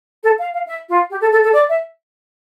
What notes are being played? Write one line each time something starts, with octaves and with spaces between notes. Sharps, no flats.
A4
F5
F5
E5
F4
G4
A4
A4
A4
D5
E5